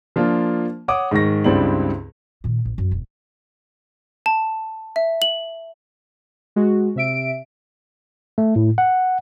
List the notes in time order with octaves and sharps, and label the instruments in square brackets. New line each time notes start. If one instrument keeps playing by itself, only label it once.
[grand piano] F3 A#3 D4 F4
C#5 F#5 D6 D#6
G#2 D#3 C#6 A#6
C#2 G2 C4 E4 D5 F#7
[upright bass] A#2 D#3
A1
F#2
E1
[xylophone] A5
E5
F#7
[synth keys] G#3 F#4
C3 E5 D7
[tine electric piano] A3
A2
F#5